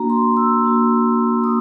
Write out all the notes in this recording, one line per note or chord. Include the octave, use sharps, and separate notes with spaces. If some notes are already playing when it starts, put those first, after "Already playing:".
Already playing: A#3 D4 F#4 A#5
C6
E6
A#3 D4 F#4
A#3 D#6